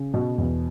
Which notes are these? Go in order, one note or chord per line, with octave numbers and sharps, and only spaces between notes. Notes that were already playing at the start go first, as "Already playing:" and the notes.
Already playing: C#3
B2
E2